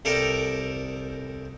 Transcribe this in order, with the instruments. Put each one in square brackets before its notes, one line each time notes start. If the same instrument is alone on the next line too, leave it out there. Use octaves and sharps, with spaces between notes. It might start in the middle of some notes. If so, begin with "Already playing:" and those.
[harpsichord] C2 G4 A4 A#4 A#5